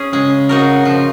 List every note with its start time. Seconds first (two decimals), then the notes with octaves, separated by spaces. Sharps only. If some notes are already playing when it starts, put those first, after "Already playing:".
Already playing: C#4 G#4
0.13 C#3 G#3
0.49 D#4 F#4 A#4
0.85 C#3 F3